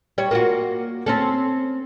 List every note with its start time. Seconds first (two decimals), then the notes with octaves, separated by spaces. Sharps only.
0.18 G3 C#5
0.31 A#3 F4 F#4
1.06 C4 C#4 A4